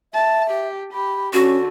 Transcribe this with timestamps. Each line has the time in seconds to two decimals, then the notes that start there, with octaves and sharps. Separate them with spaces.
0.14 E5 A5
0.50 G4
0.93 G4 B5
1.33 D3 C#4 F#4